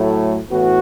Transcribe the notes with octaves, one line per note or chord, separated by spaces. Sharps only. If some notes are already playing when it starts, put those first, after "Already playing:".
Already playing: A2 F#3 A3
A2 E3 B3 F#4